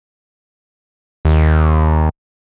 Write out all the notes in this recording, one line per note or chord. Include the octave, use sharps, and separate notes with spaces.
D#2